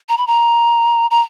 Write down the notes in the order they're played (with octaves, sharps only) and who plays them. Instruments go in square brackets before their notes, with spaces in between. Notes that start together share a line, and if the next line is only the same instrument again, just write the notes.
[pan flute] A#5
B5
A#5
A#5